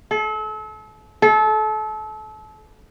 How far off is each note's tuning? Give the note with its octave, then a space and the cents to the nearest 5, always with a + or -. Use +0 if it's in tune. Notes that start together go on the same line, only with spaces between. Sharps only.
A4 -35
A4 -30